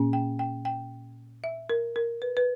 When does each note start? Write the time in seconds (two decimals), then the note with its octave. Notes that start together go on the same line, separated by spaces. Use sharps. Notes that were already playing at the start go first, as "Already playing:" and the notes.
Already playing: A#2 A#3 C#4
0.13 G5
0.39 G5
0.65 G5
1.44 E5
1.70 A#4
1.96 A#4
2.22 B4
2.37 B4